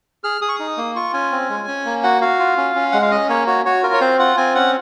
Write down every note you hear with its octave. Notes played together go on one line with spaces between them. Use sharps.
G#4 F6
G#4 D#6
C#6
D#4 D#6
A#3
F4 C#6
C#4 G#5
C4
G#3
C#4
A#3
F#4 F#5
F#4 F5
F4
C#4
C#4
G#3 F#5
F5
C#4 D#5
A#3 C#5
F#4 C#5
F#4 C#5
F4 A#4
C#5
C4 C5
F4 F#5
C4 G#5
C#4 F#5